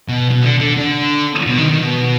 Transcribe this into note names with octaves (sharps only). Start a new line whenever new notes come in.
B2
B2
D3
D3
D3
B2
D#3
D#3
B2